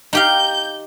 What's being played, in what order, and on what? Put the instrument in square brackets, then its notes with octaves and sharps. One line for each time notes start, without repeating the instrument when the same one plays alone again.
[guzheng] D#4 G4 F5 [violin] G6